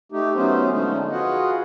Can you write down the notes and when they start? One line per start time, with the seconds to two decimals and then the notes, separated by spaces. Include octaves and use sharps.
0.12 A3 D#4 G4
0.35 F#3 A3 B3 C#4 D#4 C5
0.70 D3 F3 G#3 A3 C#4 D#4
1.11 F4 F#4 G#4 B4 D#5 F#5